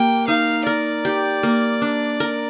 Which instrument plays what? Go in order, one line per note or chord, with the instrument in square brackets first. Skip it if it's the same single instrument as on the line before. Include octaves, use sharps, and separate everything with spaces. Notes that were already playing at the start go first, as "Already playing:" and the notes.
Already playing: [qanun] A#3 G4 [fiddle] G5
[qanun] D#4 [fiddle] F5
[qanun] A#4 [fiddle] D5
[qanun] G4
A#3
D4
A#4